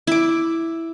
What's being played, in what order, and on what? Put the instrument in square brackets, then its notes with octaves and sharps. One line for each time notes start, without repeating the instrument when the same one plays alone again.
[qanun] E4 D6